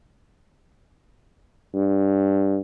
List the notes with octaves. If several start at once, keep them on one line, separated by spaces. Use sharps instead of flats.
G2